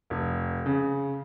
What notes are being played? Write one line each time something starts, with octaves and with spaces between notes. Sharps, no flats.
F1
C#3